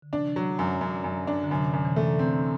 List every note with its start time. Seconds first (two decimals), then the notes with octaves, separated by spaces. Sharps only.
0.02 D3
0.13 C3 E3 D4
0.36 F#3
0.59 F#2
0.81 F#2
1.04 F#2
1.27 D4
1.44 D3
1.50 F#2 C3
1.73 F#2
1.85 C3 E3
1.96 A3
2.19 C4